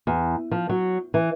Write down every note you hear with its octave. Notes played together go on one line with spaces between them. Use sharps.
E2
F3
F#3
E3